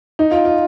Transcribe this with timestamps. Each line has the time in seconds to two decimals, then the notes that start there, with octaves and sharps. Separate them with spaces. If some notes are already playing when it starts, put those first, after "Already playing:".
0.19 D#4
0.31 F4
0.45 F4